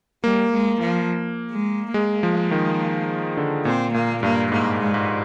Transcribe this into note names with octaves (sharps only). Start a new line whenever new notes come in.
G3 A#3
G#3
F3
G#3
G#3 A#3
F3
D#3
D3
A#2 C4
A#2 A#3
G2 A#3
G#2 A#3
G#3
G#2